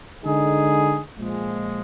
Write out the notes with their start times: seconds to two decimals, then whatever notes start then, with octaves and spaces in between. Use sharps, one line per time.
0.24 D3 G#3 D#4 G#4
1.18 A#2 F3 G#3